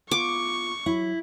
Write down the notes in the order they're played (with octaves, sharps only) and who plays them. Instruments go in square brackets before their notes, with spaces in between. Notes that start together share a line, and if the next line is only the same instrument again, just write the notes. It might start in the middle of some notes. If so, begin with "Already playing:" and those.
[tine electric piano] B3 F4 [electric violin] C#6 [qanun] D6
[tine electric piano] F#3 B5 [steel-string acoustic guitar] E4